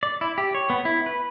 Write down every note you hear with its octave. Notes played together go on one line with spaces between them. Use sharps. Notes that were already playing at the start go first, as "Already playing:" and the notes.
D5
E4
G4
C#5
B3
E4
B4